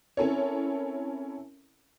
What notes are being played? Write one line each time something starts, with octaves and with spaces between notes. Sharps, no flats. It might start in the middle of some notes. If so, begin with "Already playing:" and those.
C4 C#4 E4 A4 A#4 C#5